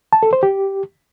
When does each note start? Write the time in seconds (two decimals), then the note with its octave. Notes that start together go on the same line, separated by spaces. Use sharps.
0.13 A5
0.23 A4
0.33 C5
0.43 G4